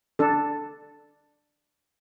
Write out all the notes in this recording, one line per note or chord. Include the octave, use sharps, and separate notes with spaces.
D4 A4